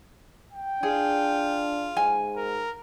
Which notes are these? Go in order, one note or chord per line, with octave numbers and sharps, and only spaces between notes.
G5
D4 F4 G#4
G#2 G#5
A#4